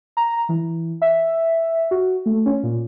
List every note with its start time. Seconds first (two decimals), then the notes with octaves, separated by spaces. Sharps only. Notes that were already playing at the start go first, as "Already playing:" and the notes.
0.17 A#5
0.49 E3
1.02 E5
1.91 F#4
2.26 A3
2.46 C#4
2.63 A#2